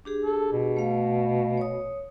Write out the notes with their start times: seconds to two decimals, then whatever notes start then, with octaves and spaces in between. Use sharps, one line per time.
0.05 D4 G4 G#4
0.25 A4
0.52 B2
0.76 A3 F5
1.57 C#5 D#6